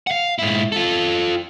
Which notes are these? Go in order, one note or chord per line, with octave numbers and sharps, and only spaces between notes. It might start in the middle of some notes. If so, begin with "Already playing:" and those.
F5 F#5
G#2 E4
F4 A4